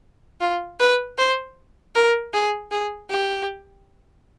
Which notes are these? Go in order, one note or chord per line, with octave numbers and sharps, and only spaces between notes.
F4
B4
C5
A#4
G#4
G#4
G4